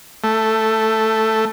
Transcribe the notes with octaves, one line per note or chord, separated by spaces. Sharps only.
A3